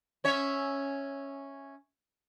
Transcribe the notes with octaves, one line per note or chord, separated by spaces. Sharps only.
C#4 C#5 E5